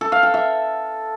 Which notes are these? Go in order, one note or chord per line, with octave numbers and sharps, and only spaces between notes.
A4
F5
G5
E5